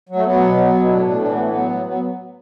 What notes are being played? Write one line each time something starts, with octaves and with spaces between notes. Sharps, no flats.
F#3
A3
F#3 B3
B2
F#3
B2
E4
A2 D4
A2 D4
E3 D4
B3
A2 A3
B3
F#3
F#3
F#3 B3